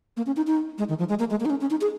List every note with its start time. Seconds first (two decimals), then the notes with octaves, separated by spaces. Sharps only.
0.17 A#3
0.26 C#4
0.36 D#4
0.47 D#4
0.78 G#3
0.89 D#3
0.99 F3
1.09 G#3
1.19 A#3
1.30 G#3
1.40 A#3
1.45 D#4
1.50 C#4
1.61 C#4
1.70 D#4
1.81 G#4